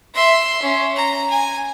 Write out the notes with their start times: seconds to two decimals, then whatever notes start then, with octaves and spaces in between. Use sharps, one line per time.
0.14 E5 C6
0.62 C#4
0.96 A#5
1.30 G#5